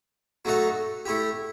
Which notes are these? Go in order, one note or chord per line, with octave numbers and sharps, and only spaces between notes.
F#3 A3 D#4 F#4 A4
A3 E4 G4